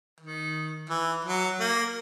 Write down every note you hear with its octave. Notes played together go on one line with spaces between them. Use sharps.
D#3
E3
F#3
A#3